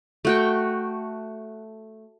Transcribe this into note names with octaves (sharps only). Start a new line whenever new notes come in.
A3 F#4 G5